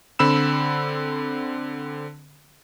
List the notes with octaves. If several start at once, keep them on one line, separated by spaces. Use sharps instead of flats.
D3 C4 B5 E6 E7